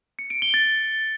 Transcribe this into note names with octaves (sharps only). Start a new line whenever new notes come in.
C#7
D7
G7
A6